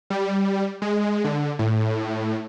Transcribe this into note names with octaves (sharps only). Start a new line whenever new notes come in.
G3
G#3
D3
A2